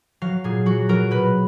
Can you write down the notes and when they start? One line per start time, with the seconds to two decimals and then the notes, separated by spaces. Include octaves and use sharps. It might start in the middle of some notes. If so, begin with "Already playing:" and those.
0.22 F#3 F5
0.44 A#2 G#4
0.66 F#3 F#4
0.89 F#3 A#4
1.11 B2 B4